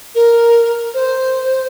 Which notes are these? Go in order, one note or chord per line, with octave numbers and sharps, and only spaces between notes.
A#4
C5